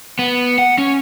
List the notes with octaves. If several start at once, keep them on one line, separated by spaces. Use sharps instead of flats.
B3
F#5
C#4